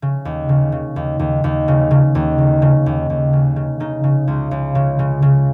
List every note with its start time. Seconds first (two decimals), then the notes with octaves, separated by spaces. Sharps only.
0.02 C#3
0.25 D#2
0.49 C#3
0.72 C#3
0.96 D#2
1.19 D#2
1.44 D#2
1.68 C#3
1.91 C#3
2.15 D#2
2.38 C#3
2.62 C#3
2.86 D#2
3.10 D#2
3.33 C#3
3.56 C#3
3.80 C#3 D#4
4.04 C#3
4.27 C#2
4.51 C#2
4.75 C#3
4.99 C#3
5.22 C#3